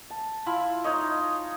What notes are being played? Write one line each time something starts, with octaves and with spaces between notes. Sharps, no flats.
A5
E4 F4 E5 B5
D#4 C#5 D#5